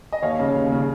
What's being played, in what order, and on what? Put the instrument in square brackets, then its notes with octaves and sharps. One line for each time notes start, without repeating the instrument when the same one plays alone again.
[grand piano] D#5
D#2 C#5 F5
C#3
D#2
C#3